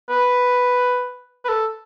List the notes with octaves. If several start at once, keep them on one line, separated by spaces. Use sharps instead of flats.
B4
B4
A4